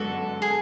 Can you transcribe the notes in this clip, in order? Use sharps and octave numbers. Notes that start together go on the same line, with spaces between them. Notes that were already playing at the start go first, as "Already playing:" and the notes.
Already playing: F#2 D3 G#3 B3 F#4 A4
G#4